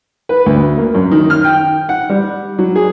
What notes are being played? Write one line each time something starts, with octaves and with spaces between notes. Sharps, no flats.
B4
D2
A#3
F#2
D#3
F6
G5
F#5
G3
F#3
G#4